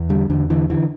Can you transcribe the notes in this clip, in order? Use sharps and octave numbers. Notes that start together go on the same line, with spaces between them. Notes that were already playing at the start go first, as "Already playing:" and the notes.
Already playing: E2
D3 G3
E2 D3
D3 E3
D3 E3